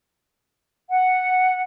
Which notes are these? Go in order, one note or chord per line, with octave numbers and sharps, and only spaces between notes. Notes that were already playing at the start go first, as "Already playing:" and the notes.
F#5